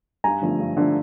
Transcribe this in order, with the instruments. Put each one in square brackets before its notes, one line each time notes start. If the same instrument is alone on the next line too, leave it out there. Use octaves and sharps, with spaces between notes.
[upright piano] G2 G#5 A#5
D3 F3 A3
G2
D3 F3 A3